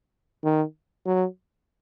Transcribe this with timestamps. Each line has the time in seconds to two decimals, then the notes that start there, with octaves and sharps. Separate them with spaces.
0.44 D#3
1.06 F#3